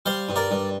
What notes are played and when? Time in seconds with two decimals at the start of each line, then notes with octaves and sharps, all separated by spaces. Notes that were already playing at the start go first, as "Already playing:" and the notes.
0.06 G3 C5 F5
0.29 G2
0.36 A#4 D5
0.51 G2